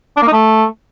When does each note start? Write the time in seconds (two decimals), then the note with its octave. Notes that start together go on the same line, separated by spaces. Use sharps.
0.17 D4
0.22 A#3
0.27 D#4
0.32 A3